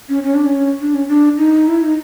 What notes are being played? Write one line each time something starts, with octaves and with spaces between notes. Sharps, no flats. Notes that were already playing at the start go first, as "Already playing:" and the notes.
C#4
C#4
D4
C#4
D4
C#4
D4
D#4
E4
D#4